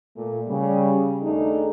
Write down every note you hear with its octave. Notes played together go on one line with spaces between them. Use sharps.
A#2 A3
C#3 G3
D#2 A3 D4 D#4 G#4